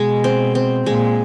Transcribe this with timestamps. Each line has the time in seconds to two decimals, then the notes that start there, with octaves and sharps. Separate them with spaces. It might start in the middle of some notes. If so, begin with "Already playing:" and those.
Already playing: B2 G#3
0.24 C4
0.55 C4
0.86 A#2 G#3